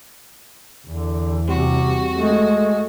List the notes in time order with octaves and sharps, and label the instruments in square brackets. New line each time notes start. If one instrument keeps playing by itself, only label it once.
[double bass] E2 [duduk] D3
[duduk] C3 [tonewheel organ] G3 C4 G4 [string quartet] F#4
[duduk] G#3 [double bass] A3